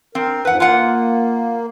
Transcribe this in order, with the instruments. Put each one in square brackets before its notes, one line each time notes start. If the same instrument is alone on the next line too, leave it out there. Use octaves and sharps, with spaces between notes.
[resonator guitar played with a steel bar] C4 [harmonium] A#4
[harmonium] F2 G#2 F3 [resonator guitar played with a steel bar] B4 F#5
[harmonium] A#3 [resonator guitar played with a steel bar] F4 F#5